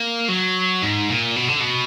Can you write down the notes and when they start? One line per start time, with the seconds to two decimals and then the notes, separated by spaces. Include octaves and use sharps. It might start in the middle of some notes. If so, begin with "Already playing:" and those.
Already playing: A#3
0.29 F#3
0.82 G#2
1.09 A#2
1.36 B2
1.48 D3
1.60 B2